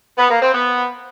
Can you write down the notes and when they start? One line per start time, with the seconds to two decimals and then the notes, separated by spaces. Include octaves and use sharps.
0.18 B3
0.30 A#3
0.42 C4
0.54 B3